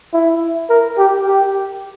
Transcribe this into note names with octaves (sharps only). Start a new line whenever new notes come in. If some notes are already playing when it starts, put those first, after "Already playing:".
E4
A#4
G4
G4